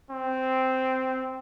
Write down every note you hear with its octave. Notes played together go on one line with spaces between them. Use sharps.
C4